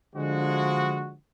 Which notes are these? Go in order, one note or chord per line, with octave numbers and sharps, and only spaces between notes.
D3 F3 G#3 F#4